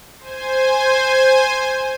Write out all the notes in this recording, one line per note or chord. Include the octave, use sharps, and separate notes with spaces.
C5 G#5